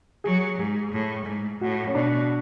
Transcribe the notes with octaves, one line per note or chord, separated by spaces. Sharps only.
F#3 G#4
G#2 G#4
A2
G#2
A2 F#4
C#4
B2 D4